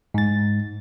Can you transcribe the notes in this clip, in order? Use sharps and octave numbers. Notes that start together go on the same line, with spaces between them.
G#2 A6